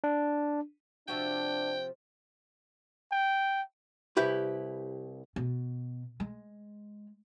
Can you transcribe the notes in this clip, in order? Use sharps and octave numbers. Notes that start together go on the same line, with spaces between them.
D4
C3 F3 D4 F#4 G5
G5
C2 E4 G4 B4
B2
G#3